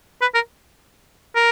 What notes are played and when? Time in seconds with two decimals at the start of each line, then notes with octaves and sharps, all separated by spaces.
0.21 B4
0.35 A#4
1.36 A#4